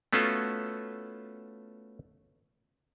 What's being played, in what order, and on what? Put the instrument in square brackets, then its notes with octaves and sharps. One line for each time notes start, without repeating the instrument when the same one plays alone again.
[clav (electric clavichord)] A3 B3 C#4 F4 F#4 A4